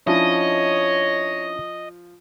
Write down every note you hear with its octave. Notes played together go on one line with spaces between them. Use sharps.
F3 C#4 D4 E4 C#5 D#5